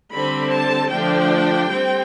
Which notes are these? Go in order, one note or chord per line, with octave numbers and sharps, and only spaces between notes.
D3 G3 C4 B5
A5
D3 F3 A3 D4 G5
G3 C4